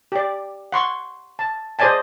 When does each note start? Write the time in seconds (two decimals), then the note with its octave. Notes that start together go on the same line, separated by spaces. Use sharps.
0.12 G4 D5
0.72 F#5 C6 C#6
1.39 A5
1.79 G#4 C5 D5 D#5 G#5 A5